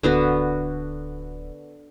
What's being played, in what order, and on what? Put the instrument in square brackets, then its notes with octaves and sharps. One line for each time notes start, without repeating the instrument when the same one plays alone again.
[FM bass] D1 [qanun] D3 B3 F#4